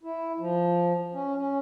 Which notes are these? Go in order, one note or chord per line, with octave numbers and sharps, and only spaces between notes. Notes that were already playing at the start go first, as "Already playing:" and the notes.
E4
F3
C#4
C#4